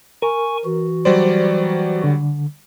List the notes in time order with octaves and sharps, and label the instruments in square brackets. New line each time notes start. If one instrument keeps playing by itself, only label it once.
[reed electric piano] A#4 [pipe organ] G#5 C#6
[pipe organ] E3 F#4
[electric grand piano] F#3 G3 D5 [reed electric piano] C5
[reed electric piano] D3